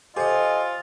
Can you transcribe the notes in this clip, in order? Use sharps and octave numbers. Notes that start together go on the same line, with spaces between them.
F4 G4 A4 C5 D#5 F#5 G#5